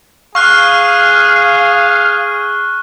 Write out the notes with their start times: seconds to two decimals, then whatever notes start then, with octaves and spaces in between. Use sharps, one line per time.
0.35 G#4 F5 C#6 F6 F#6